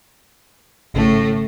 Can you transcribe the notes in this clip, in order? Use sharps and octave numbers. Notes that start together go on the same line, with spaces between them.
G#1 A2 C#3 A3